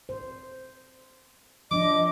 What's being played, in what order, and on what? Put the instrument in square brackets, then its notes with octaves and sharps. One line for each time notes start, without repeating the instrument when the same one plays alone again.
[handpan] C5
[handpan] F3 D4 [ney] D#5 [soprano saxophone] D6